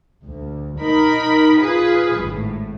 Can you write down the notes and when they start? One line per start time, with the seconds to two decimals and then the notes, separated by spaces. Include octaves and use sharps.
0.25 D2
0.80 D#4 A#4 B5
1.59 F4 G#4 B4
2.17 G#1 A2